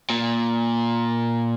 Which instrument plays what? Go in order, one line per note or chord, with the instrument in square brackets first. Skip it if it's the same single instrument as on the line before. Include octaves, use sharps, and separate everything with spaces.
[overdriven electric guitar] A#2